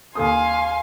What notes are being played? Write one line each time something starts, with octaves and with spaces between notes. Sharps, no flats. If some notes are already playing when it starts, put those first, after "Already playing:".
D#2 A4 F5 G#5 C6 D#6